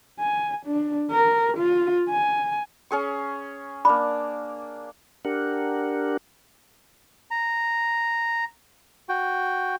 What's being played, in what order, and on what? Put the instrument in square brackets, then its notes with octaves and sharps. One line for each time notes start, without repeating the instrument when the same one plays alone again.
[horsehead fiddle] G#5
D4
A#4
F4
G#5
[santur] C#4 G#4 C#6
[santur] A#3 D4 [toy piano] B5
[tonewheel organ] D4 G4 A#4 F#5
[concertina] A#5
F#4 G5